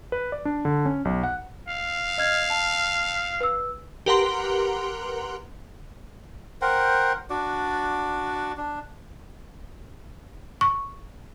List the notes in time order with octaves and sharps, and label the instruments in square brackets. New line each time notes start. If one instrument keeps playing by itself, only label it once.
[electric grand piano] B4
D5
D4
D3
C#4
B1
F#5
[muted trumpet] F5
[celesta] D#5 F6 G#6
A5
B4 E6
[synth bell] G4 A#4 B4 F#5 A#5 C6
[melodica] A#4 C5 F#5 G5
D4 F#4 D5
D4
[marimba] C#6